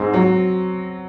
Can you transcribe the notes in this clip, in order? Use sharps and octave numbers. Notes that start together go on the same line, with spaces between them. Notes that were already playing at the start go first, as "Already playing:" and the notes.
Already playing: G#2 C4
F#3